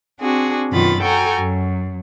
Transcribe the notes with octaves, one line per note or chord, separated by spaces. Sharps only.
C4 D4 F#4 G#4
F#2 B2 D#3 F4 B5 A6
F#4 A4 G5 G#5 A#5
F#2